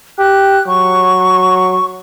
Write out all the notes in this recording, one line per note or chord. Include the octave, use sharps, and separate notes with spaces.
G4 F#6
F#3 C#6